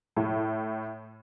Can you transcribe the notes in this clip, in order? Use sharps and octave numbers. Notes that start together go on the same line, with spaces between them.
A2